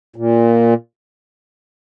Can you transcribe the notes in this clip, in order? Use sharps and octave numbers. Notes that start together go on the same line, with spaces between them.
A#2